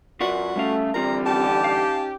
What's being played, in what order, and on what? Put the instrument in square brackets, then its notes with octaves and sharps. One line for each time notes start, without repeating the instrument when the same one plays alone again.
[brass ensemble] F#2 [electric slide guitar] F4 B4 D5 [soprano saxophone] F#4
[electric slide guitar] G3 C#4 F5 [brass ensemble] A3
[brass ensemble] D3 E3 G3 [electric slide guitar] C4 F4 A#4 [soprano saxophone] A#5
[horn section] C#4 D#4 G4 [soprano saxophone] A5
[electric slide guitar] F5